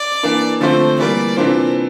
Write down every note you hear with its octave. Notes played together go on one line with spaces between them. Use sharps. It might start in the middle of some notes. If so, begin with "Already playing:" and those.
Already playing: D5
E3 A#3 D4
D3 F3 A3 C4 F4 C5
E3 G3 A#3 D5
C3 E3 A#3 D4 F4 C5